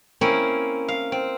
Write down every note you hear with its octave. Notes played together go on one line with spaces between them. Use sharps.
A#3 C4 C#4 E4
F5
C4